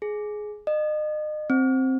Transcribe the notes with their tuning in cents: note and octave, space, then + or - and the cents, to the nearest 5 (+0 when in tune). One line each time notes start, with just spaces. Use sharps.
G#4 +15
D#5 -35
C4 +5